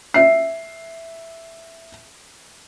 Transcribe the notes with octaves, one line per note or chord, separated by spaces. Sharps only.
E5 C7